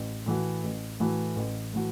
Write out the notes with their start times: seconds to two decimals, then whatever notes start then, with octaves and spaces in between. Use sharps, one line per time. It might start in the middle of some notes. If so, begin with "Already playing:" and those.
Already playing: A1
0.26 A2 E3 A3 F#4
0.64 A1
1.00 A2 E3 A3 F#4
1.36 A1
1.74 A2 E3 A3 F#4